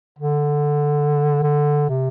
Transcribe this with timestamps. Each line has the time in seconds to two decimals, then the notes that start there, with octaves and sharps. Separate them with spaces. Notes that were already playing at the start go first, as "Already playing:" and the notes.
0.18 D3
1.42 D3
1.89 C3